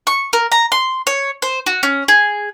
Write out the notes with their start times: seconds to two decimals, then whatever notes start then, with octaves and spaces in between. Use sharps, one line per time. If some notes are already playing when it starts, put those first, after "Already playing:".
0.07 C#6
0.33 A#4
0.52 A#5
0.72 C6
1.07 C#5
1.42 C5
1.66 F#4
1.83 C#4
2.08 G#4